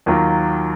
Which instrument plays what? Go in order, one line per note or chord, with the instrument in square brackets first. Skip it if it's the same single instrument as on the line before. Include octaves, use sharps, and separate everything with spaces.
[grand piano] D#2 D#3 F#3 A#3 F4